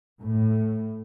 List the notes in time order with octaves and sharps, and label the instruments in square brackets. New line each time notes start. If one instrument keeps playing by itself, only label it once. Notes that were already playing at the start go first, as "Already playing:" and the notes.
[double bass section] A2